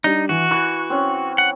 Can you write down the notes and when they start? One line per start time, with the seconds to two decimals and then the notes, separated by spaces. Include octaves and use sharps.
0.04 G3 D4 D#4
0.29 E3 F#4
0.51 E3 C#6 F#6
0.90 C4 C#4
1.38 F#5